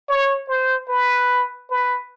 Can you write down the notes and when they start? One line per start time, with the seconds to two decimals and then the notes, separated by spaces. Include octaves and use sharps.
0.09 C#5
0.48 C5
0.88 B4
1.70 B4